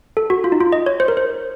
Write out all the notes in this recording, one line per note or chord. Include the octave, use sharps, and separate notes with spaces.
A4
F#4
F4
D#4
F4
D#5
C#5
C5
A#4
C5